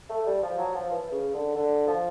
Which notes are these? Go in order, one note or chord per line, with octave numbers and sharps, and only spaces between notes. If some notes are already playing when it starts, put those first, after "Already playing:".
A3
G3
F3
F#3
F3
E3
C#3
D3
D3
F3